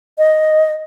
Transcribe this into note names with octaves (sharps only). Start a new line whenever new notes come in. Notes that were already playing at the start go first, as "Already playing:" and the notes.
D#5